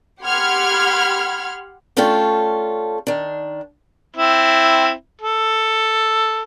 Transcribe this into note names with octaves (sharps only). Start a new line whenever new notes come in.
G4 F#5 B5 C6 F6 G#6
A3 C#4 D4 F4 A4 G5
D#3 D4
C4 E4
A4